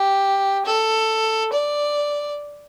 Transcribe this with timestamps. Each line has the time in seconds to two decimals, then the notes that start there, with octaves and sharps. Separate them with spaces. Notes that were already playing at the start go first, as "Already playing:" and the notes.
Already playing: G4
0.65 A4
1.53 D5